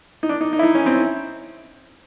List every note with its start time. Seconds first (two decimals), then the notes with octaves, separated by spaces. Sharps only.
0.23 D#4
0.29 D4
0.41 D#4
0.53 D#4
0.59 E4
0.63 D#4
0.75 C#4
0.86 C4